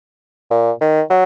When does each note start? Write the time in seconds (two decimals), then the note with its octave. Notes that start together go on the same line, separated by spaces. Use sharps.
0.51 A#2
0.81 D#3
1.10 F#3